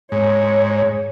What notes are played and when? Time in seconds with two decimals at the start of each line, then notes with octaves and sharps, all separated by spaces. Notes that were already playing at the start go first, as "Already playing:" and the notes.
0.12 G#2 C#5